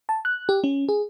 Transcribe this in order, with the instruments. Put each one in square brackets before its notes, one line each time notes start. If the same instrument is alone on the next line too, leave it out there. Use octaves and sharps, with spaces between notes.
[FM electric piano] A5
F#6
G4
C#4
G#4